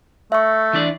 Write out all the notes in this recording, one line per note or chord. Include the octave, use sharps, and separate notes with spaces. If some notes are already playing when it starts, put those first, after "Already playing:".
A3 E5 C#6
E3 D4 D5